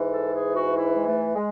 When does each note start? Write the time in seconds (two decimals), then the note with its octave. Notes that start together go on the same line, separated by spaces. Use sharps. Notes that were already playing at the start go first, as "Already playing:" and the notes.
Already playing: G#2 E3
0.11 A4
0.34 G#4
0.55 F#4
0.77 E4
0.94 G#3
1.06 A3
1.36 G#3